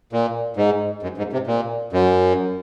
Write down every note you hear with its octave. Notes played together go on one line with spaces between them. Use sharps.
A#2
G#2
F#2
G#2
C3
A#2
F#2